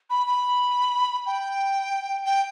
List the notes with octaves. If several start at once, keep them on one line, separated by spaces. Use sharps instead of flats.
B5
B5
G5
G5